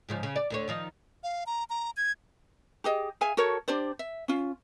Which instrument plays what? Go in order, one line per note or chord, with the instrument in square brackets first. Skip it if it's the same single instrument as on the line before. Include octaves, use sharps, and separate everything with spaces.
[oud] G#2 C#3 F3
C#3
D5
D2 D3 C#5
D#3 F3 D#4
[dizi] F5
A#5
A#5
G#6
[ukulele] G4 G#4 D#5
G#4 E5 F5 G#5
F#4 A4 A#4 C#5
D4 G4 C5 D5
E5
C#4 F4